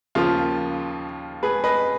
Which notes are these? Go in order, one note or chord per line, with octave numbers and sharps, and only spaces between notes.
D#2 C#3 F3 F4
G#4 B4
B4 D#5